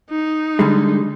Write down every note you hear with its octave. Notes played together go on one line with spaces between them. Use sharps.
D#4
D3 G3 G#3